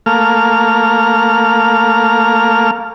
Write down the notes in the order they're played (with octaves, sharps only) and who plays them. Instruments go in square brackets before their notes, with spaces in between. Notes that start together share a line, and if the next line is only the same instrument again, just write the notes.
[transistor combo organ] A3 A#3 F5 F6